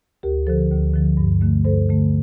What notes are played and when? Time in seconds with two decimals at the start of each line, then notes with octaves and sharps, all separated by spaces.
0.23 D2 G4 A#4
0.47 D3 F3 A4 C5
0.71 D2
0.94 D3 F3
1.17 G2
1.41 D3 A3
1.65 G2 A4 C5
1.89 D3 A3